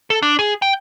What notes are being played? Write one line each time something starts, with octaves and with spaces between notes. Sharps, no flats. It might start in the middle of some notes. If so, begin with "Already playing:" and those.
A4
D4
G#4
G5